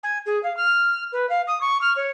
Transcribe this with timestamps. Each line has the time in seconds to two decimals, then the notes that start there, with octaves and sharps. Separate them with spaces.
0.03 G#5
0.26 G#4
0.43 F5
0.56 F6
1.12 B4
1.29 F5
1.47 D#6
1.61 C#6
1.81 F6
1.96 C#5